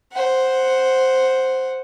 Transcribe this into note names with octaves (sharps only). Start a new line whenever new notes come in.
C5 F#5